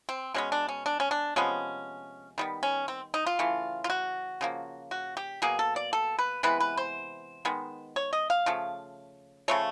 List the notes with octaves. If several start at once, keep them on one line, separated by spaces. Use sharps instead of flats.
C4
B2 G#3 B3 C#4
D4
C#4
D4
C#4
D4
C3 F3 G#3 B3 C#4
D#3 G3 B3
C#4
C4
D#4
F4
C#3 E3 A3
F4
F#4
C#3 F3 A#3
F#4
G4
B2 F#3 A#3 G#4
A4
D5
A4
B4
C3 E3 G#3 B3 B4
B4
C5
D#3 G#3 B3
C#5
D#5
F5
C#3 F3 A3
C#3 F3 A3 C#5